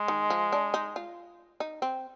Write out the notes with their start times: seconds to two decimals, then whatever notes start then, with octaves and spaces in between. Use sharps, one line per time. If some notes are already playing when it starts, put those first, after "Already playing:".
Already playing: G#3
0.08 D#3
0.30 F3
0.53 D4
0.74 D#4
0.96 F4
1.60 D#4
1.82 C4